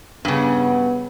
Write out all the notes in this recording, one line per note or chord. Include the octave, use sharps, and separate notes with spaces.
G2 C#3 B3